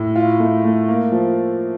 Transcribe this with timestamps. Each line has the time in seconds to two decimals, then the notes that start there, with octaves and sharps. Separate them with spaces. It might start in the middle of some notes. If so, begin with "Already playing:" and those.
Already playing: A2
0.16 F4
0.40 A3
0.64 A3
0.89 A#3
1.12 F3